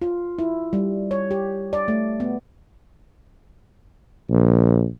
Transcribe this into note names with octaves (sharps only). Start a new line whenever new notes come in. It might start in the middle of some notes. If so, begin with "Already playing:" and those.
F4
E4
G3
C#5
G4
D5
A3
B3
A#1